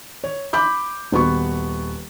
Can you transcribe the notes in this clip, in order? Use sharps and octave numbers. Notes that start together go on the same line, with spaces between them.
C#5
B5 D6 G6
D#1 B3 F#4 C#6